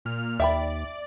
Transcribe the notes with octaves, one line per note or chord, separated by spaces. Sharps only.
A#2 F6
D#2 D5 E5 G5 B5